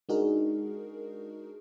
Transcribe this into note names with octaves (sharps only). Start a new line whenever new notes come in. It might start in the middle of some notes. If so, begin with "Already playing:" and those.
G#3 D4 D#4 F#4 G#4 A#4